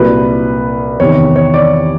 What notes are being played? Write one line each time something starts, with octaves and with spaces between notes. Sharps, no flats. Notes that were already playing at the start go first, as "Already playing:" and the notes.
Already playing: C2 A#2 F#3 B4
E2 C3 D#3 C#5
C#5
D5